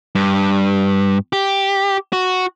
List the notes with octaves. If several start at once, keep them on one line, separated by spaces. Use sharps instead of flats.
G2
G4
F#4